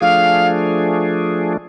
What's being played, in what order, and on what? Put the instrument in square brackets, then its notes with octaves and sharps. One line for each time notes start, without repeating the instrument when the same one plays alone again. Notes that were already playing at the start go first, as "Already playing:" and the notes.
[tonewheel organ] F3 A3 D4 G#4 [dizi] F5